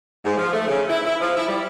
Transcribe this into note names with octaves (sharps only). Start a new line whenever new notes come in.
G#2
F3
A3
C#3
E4
E4
F3
E4
G3